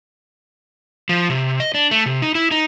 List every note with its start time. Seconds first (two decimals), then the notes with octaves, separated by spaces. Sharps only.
1.09 F3
1.30 C3
1.60 D#5
1.75 D4
1.91 A3
2.06 C3
2.22 D#4
2.35 E4
2.51 D#4